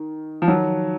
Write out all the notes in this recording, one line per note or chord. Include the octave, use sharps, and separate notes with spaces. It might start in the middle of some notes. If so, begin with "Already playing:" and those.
Already playing: D#3
F3
D#3 F#3